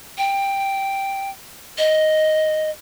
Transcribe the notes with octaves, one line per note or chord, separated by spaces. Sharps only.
G5
D#5